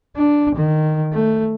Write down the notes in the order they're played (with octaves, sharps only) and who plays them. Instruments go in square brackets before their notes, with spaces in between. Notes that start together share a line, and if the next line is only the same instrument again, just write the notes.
[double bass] D4
D#3
A3